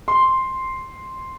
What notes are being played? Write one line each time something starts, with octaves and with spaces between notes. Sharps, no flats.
C6